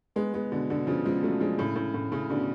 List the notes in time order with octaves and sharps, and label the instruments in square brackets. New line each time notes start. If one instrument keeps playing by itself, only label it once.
[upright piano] G#3 B3
G#3 B3
B2 D3
B2 D3
C#3 F3
F3 G#3
F#3 A3
F3 G#3
A2 C#3
A2
A2
A2 C#3
B2 D3